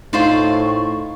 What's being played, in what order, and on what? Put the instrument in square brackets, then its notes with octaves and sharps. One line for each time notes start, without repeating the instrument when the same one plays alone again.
[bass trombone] A2 [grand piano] D#4 [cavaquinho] F4 C5 D5 [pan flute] C#6